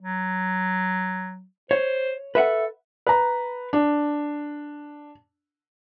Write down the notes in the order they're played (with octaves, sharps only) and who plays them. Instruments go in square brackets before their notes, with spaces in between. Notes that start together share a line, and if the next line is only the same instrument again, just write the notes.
[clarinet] F#3
[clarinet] C5 [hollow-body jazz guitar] C#5
[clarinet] A4 [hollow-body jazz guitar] B4 E5 F#5
[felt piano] B4 A#5
D4